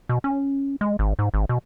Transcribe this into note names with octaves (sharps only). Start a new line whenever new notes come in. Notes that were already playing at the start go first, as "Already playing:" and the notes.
B2
C#4
G#3
G#1
G#2
G#1
B2